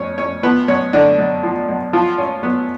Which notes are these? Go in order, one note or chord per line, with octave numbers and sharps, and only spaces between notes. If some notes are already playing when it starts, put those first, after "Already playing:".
Already playing: F2 C#4 C#5
F2 C#4 C#5
F3 B3 B4
B1 C#4 C#5
B1 D3 D4
B1
F3
B1
F3 F#3 F4
G#1 C#4
F#3 B3